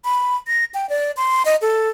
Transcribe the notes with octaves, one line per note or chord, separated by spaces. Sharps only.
B5
A#6
G5
D5
C6
D#5
A4